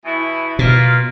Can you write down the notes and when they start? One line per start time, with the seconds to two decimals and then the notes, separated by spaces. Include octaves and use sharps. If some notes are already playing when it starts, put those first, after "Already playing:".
0.04 B2 E3 E4
0.59 B2 A#3 F4